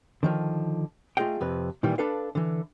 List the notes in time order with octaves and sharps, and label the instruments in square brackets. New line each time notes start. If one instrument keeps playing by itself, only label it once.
[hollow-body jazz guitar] D3 D#3 F3
A3 F4 G#4 D#5 F5 G5
F2 C3 B4
A#2 D#3 E3 G3
D4 A4 B4 F5
D3 E3